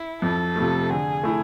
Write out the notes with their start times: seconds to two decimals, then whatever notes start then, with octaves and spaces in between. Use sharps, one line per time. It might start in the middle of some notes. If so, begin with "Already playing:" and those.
Already playing: E4
0.22 F2 A4
0.56 C3 F3 A3
0.90 D3 G#4
1.23 A3 E4